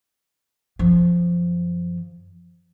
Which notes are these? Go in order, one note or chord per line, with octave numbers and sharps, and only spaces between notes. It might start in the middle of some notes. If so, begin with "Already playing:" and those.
F#2 F3